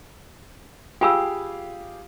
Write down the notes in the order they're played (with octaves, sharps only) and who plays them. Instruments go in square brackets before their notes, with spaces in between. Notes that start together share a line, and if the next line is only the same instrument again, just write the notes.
[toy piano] F4 B5 E6 [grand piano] G4 G#4 F5 [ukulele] G5